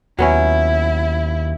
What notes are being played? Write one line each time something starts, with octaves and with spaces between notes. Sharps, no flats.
D#2 F#3 B3 C#4 E4